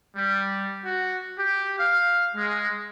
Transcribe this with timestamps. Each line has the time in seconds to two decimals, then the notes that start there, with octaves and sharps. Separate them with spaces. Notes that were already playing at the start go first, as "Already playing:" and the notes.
0.16 G3
0.84 F#4
1.37 G4
1.79 F5
2.35 G#3